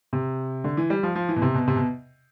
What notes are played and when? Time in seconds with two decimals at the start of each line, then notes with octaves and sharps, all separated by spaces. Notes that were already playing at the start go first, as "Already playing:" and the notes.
0.13 C3
0.64 D3
0.77 E3
0.90 G3
1.03 F3
1.15 F3
1.29 E3
1.36 B2
1.42 C3
1.55 B2
1.68 C3
1.76 B2